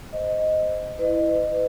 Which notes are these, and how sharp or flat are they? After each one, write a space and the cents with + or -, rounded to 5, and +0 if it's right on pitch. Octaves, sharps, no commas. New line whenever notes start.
C5 -15 D#5 +0
E4 +0 B4 +35 D#5 -20